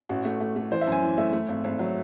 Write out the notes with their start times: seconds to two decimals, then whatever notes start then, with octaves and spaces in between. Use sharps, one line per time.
0.09 A1 F#4
0.25 A3
0.40 A3
0.56 A3
0.71 E3 C5
0.81 E5
0.87 F#2
0.92 G#5
1.02 E3
1.18 A3 E5
1.33 A3
1.49 G#1
1.64 G#1
1.79 F#3